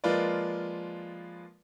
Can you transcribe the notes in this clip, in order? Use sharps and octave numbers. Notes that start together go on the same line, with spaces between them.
F3 G#3 A#3 F4 B4 D5